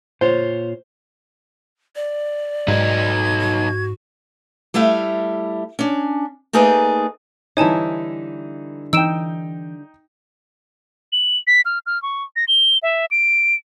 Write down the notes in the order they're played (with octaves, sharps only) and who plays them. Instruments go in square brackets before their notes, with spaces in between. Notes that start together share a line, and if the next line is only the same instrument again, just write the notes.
[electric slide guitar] A#2 F4 C#5 [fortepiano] C5
[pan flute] D5
[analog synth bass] G#2 [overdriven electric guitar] F#3 D#4 [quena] G#6
[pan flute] F#4
[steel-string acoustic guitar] G3 A3 E4 E5 F5
C#4 D4
A3 A#3 D#4 G#4 B4 D5
[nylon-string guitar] D3 G3 E4 [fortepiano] E3 D#4 [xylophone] C#5 G#5 A5
[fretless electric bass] E3 [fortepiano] D#4 G5 [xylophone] E6 D7 E7
[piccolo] F#7
B6
F6
F6
C#6
A#6
G7
E5
D7